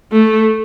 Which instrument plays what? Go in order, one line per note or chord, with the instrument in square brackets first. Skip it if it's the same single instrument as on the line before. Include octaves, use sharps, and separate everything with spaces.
[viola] A3